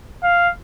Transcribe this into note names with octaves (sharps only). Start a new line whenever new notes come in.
F5